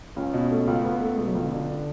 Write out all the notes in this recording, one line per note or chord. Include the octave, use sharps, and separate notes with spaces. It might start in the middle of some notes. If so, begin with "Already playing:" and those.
C#2 C#4
B2
A3
C#2
C#2 B3
A3
B2 G#3
F#3
C#2 F3
D3
D4
D4